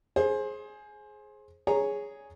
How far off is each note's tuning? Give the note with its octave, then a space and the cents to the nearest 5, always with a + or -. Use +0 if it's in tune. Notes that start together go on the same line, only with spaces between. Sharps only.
G#4 +15 C5 +25
G#4 +0 C#5 +0 A#5 +0